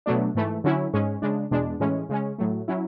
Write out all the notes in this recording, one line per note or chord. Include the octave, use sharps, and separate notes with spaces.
B2 F#3 A3 D4
G#2 E3 A3
D3 F#3 C#4 E4
G#2 G#3 C#4
C#3 G#3 D4
E2 B2 G#3 D4
A2 E3 G#3 C#4
C#3 G#3 C#4
A2 F#3 A3
F#3 C#4 E4